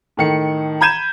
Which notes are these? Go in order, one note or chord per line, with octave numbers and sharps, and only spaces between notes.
A2 D#3 C#7
A#5 B5 G6 G#6 D#7 E7